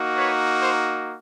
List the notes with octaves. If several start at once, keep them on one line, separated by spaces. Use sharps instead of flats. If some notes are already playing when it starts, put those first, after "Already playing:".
Already playing: A#3 D#4 F#4
B4 C#5
A#4 C5